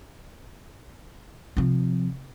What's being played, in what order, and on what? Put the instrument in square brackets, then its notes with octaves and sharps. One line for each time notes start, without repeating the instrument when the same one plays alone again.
[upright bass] C3 F3